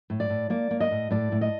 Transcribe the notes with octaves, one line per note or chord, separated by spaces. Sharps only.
A2
D5
A2
A#3 D5
A#3
D#5
A2
A2 D5
A2
D#5